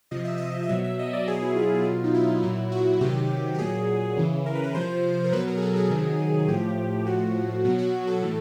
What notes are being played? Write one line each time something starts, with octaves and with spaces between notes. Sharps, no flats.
C3 F3 D#5
E5
D#5
D#5
B2 F#3 E5
E5
D#5
D5
B2 F#3 G#4
E4
F4
B2 F#3
D#4
E4
A#2 F#3 E4
F#4
C3 D#3 F#3 G4
G4
A#2 F#3 G#4
C#3 E3
A#4
B4
A#4
C3 F3 C5
A#4
B2 F#3 B4
A#4
G#4
A4
G#4
C3 D#3 F#3
A2 F3 G4
A2 F3 F#4
B2 F#3 F#4
F#4
A4
A2 E3